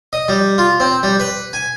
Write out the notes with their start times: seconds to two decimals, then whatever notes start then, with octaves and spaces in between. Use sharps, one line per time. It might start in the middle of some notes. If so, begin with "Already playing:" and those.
0.13 D#5
0.28 G3
0.58 F4
0.80 C4
1.03 G3
1.20 B4
1.53 G#5